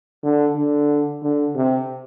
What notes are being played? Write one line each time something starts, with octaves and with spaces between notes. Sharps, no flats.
D3
D3
D3
C3